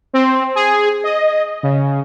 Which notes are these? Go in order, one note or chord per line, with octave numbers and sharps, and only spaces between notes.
C4
G#4
D#5
C#3